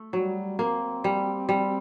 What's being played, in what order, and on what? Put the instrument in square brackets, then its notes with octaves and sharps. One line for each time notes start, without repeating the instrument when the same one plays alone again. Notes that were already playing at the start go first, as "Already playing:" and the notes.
Already playing: [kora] A3
[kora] F#3 [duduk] G3
[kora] A#3 [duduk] C4
[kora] G3
G3